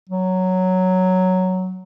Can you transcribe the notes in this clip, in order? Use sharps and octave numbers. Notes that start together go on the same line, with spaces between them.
F#3